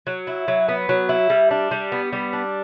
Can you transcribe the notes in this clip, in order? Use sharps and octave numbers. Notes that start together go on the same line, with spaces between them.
F#3
E4
F#3
B3
F#3
E4
G3
D4
G3
B3
G3
D4